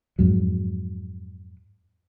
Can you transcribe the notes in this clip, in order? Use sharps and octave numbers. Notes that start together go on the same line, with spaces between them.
F2 G#2 F#3